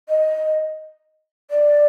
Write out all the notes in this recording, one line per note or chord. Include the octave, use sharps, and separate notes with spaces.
D#5
D5